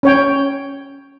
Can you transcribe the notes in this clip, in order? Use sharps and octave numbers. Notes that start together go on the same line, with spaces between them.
C#4 C#5 G5